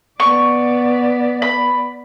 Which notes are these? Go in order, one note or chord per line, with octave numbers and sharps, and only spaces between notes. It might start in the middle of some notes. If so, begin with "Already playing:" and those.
B3 D5 C#6
B5